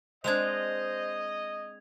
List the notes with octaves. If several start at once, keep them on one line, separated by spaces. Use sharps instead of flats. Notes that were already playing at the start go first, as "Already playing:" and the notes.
G#3 C4 D4 C5 D#5 G#6 F7